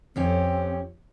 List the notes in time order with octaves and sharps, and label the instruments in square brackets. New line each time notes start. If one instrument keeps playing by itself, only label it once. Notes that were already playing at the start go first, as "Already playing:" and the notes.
[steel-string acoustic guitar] F2 C#4 G4 [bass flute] C4